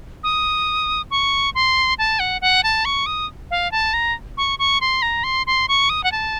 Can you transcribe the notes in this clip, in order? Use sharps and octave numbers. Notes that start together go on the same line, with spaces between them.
D#6
C#6
C6
A5
F#5
F#5
A5
C#6
D#6
F5
A5
A#5
C#6
C#6
C6
A#5
C6
C6
C#6
D#6
F#5
A5